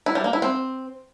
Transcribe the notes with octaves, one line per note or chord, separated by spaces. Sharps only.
E4
G3
A#3
E4
C4